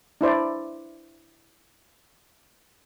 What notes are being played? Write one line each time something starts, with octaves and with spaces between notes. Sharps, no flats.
D4 E4 C5 D5